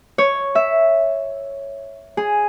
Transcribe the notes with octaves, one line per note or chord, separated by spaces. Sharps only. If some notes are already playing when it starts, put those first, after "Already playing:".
C#5
E5
G#4